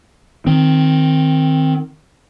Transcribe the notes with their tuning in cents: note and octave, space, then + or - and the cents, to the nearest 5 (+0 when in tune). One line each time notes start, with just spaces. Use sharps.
D#3 +0 C4 +0